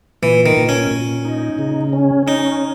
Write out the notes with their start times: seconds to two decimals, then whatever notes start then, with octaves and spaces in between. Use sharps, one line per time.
0.23 A#2 E3
0.46 D#3
0.57 A#2
0.69 C#4
0.91 A#2
1.25 D#4
1.59 C#3
1.93 C#4
2.27 C#4 D#4